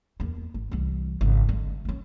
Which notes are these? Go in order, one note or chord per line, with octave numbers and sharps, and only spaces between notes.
E2 A#3
G#1
C2 E3
G#1 C#3
D3 G#3
B3 C#4